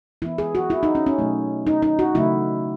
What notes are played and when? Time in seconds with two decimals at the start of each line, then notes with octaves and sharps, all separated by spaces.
0.22 E3 B3 E4
0.38 G#4
0.55 F#4
0.70 E4
0.83 D#4
0.95 C#4
1.06 C#4
1.19 B2 F#3 A3
1.67 D#4
1.82 D#4
1.99 F#4
2.14 C#3 F#3 A3 E4